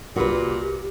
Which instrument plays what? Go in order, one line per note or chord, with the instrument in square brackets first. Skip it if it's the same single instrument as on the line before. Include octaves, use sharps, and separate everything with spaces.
[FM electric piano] C2 A#4 [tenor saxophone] A#2 [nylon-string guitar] F#4 B4 [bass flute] G4